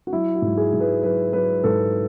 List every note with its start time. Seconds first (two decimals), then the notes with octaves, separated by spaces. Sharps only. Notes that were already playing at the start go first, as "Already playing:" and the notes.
0.07 F#4
0.13 F#3 E4
0.35 F#4
0.42 G#2
0.57 G#4
0.73 G#2
0.80 B4
1.03 F#3 B4
1.33 F#3 B4
1.63 G#2 A4